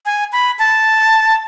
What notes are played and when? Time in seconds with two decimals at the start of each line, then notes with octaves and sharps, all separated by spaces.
0.06 G#5
0.33 B5
0.59 A5